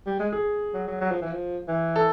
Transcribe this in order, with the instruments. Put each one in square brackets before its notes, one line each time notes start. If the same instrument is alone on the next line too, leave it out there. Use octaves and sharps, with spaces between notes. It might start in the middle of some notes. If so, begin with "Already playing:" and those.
[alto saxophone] G3
G#3
[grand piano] G#4
[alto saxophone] F#3
F#3
F#3
F3
E3
F3
E3
[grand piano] A4